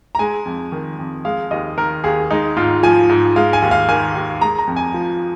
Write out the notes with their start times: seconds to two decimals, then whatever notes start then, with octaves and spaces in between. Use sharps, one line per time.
0.15 A#5
0.19 G#3 G#5
0.46 F2
0.72 D#3
0.99 F2
1.25 G#3 F5
1.51 D#2 D#5
1.77 D#3 A#4
2.04 D#2 G#4
2.30 G#3 D#4
2.57 G#2 F4
2.83 F3 G#5
3.09 G#2
3.36 G#3 F5
3.53 G#5
3.62 D#2
3.71 F5
3.88 D#3 G#5
4.15 D#2
4.41 G#3 A#5
4.59 A#5
4.67 F2
4.76 G#5
4.94 F3